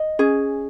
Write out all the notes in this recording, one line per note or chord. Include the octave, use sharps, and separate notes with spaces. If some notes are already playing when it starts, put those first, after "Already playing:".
Already playing: D#5
C#4 G#4